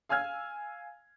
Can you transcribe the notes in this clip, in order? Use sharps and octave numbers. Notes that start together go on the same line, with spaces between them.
F5 G#5 E6 F6 G#6